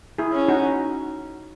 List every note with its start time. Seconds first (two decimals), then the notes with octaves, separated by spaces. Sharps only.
0.18 E4 G#4
0.33 C#4
0.48 D#4 F#4